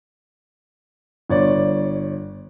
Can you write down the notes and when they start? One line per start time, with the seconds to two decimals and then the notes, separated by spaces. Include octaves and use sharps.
1.30 G1 C#5 D5